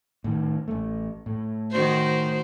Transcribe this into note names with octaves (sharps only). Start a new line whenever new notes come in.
A2 D#3
A1 A3
A2
D#3 F#4 C5